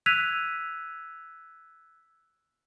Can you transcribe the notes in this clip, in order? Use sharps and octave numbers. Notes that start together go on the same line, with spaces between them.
E6 F#6 G#6 B6 D#7 F7